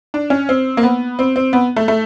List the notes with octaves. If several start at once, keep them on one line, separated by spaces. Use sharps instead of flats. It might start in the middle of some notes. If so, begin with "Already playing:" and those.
D4
C#4
C4
A#3
B3
C4
C4
B3
A3
A3